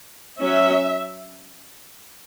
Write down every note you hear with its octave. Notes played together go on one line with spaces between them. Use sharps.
F#3 C#4 E5